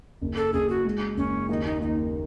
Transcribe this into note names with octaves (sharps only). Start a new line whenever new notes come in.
F#1
A4
F#1 G#4
F#4
G#3
F#1 C#4
D#2 D#4
D#4
D#2 D#4